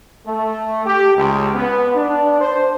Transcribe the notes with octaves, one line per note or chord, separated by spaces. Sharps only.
A3
G4
C#2
B3
D4
C5